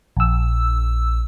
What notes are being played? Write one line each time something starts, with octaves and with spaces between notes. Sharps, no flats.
A#1 E6